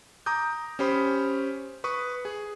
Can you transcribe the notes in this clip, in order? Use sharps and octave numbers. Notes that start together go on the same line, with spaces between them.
A#5 D6 D#6 G6
C#4 G4 C5 B5 D#6
B4 C#6 D#6
G#4